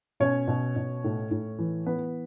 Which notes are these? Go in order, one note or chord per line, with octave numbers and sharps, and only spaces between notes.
B2 C#4 C#5
B2
B2
A2
A2
E3
E3 B3 B4